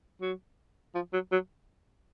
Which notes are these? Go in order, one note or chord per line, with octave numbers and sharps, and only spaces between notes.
F#3
F3
F#3
F#3